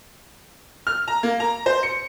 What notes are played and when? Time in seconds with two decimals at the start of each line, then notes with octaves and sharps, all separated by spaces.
0.87 F6
1.08 A#5
1.23 A#3
1.40 A#5
1.66 C5
1.83 C#7